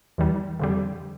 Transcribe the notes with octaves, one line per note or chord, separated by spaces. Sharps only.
E2 E3 G3
F2 D3 G3